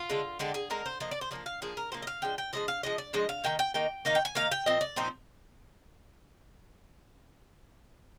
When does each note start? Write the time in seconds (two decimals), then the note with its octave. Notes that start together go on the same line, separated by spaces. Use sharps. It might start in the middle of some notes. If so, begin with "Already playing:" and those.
Already playing: F4
0.10 D3 G#3 D4
0.39 D3 G#3 D4 G4
0.54 G#4
0.70 D3 G#3 D4 A#4
0.86 C5
1.00 F3 A#3 D4 D#5
1.11 D5
1.21 C5
1.31 F3 A#3 D4 D5
1.46 F5
1.62 F3 A#3 D4 G#4
1.77 A#4
1.92 F3 A#3 D4 C5
2.02 D#5
2.07 F5
2.22 F3 G#3 D4 G5
2.38 G5
2.53 F3 G#3 D4 D#5
2.68 F5
2.83 F3 G#3 D4 D#5
2.98 D5
3.13 F3 G#3 D4 D#5
3.29 F5
3.44 D#3 A#3 D#4 G5
3.59 G5
3.74 D#3 A#3 D#4 G5
4.05 D#3 A#3 D#4 F5
4.15 G5
4.25 G#5
4.35 D#3 A#3 D#4 F5
4.52 G5
4.66 A#2 F3 C4 D#5
4.81 D5
4.96 A#2 F3 C4 D#4 C5